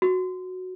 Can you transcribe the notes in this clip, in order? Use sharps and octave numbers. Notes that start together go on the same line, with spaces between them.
F#4